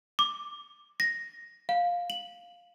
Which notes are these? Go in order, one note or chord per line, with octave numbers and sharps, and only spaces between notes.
D6
A#6
F5
F#7